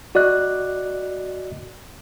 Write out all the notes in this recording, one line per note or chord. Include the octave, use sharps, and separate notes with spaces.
F#4 D5 D#5 F#6